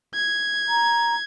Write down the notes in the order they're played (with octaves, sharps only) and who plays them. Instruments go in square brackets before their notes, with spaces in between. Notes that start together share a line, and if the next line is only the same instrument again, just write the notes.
[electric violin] G#6
[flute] A#5